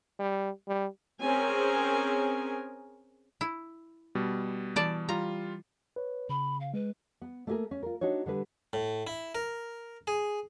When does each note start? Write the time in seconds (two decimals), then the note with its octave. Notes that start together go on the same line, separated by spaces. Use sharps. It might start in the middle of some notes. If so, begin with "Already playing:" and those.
0.19 G3
0.67 G3
1.24 C4 C#4 G#4 A#4 G#5
3.41 E4
4.15 B2 G3
4.76 E3 D5 A5
5.09 G3 F4 A#5
5.96 B4 C#5
6.29 C#3 B5
6.60 F5
6.74 G#3 B4
7.22 B3
7.47 A3 A#3 D4 G4 G#4 A#4
7.71 C#4
7.83 F4 A#4
8.01 D4 D#4 F#4 C#5
8.26 D3 G3 G#4 B4
8.73 A2
9.07 E4
9.35 A#4
10.07 G#4